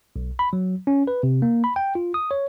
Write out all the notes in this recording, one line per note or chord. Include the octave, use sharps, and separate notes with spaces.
B1
B5
F#3
C#4
B4
C3
A#3
B5
G5
F4
D#6
C#5